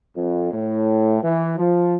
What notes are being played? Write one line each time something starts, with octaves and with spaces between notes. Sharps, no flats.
F2
A2
E3
F3